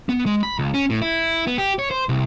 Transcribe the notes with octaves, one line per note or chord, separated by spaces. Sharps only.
B3
G#3
B5
C#2
C#4
A2
E4
B3
G4
C#5
C5
C2